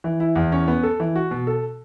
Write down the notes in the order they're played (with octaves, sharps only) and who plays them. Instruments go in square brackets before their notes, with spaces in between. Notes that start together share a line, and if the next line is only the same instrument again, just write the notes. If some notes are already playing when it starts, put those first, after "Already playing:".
[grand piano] E3
E4
E2
C#4
B3
A4
E3
F#4
B2
A4